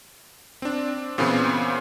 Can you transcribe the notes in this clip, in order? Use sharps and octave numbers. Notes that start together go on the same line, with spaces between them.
C4 D4
A#2 C#3 E3 B3 C4